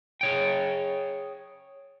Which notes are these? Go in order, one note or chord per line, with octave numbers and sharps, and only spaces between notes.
G#4 C#5 G5